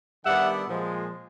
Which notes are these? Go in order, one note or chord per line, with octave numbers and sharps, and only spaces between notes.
D#3 G3 B3 D4 E5 F#5
A#2 F3 G#3